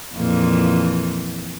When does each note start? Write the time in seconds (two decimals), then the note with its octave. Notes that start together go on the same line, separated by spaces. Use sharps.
0.15 F2 A#2 E3